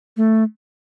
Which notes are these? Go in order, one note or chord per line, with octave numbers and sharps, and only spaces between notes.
A3